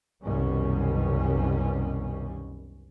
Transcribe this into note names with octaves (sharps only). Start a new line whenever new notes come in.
C2 F#2 B2 D#3 G3 C#4